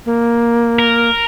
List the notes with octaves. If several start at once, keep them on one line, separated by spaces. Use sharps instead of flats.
A#3
A#4